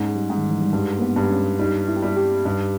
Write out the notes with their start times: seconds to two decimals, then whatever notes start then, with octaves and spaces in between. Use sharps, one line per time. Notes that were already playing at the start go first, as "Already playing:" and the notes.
Already playing: G#2 A#3 C#4
0.09 G#3
0.15 G3
0.30 G#2
0.37 D#3
0.50 E3
0.61 G3
0.73 G2 G#3
0.98 A#3
1.02 B3
1.16 G2
1.30 C#4
1.59 G3 D#4
1.88 E4
1.96 G4
2.02 G3 E4
2.17 G4
2.45 G2 D#4